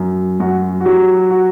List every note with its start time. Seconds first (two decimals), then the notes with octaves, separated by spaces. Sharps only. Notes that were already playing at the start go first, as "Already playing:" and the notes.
Already playing: F#2
0.40 F#2 F#4
0.80 F#4
0.85 F#3 G4
1.30 F#4